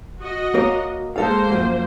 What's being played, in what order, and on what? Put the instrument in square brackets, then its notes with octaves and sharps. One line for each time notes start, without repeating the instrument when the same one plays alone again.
[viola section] F#4 D#5
[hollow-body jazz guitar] A#3 A#4 C#5
[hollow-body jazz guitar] G#3 A4 F5 [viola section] A#3 C5
[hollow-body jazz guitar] F#2 F3